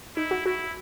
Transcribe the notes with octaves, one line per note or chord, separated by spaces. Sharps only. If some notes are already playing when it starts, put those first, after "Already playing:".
D#4 E4
F#4
E4 F#4